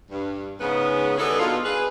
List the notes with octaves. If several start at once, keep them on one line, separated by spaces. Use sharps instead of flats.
G2
G#2 C#3 B3
D#3 E3 G3 B3 G#4 A4
B2 D4 D#4 F4
G#4 B4